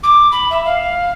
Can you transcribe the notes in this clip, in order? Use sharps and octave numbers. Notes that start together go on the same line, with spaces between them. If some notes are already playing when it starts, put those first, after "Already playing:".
D6
B5
E5
F5